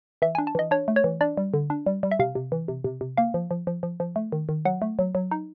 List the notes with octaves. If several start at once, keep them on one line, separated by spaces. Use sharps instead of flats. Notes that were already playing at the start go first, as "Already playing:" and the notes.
E3 E5
D4 G#5
A5
E3 D#5
D4 C#5
A3
C#5
E3
D4 D5
G3
D3
D4
G3
G3
E5
C3 F5
C3
E3
C3
C3
C3
A#3 F5
F3
F3
F3
F3
F3
A3
D#3
D#3
F#3 F#5
A3
F#3
F#3
D#4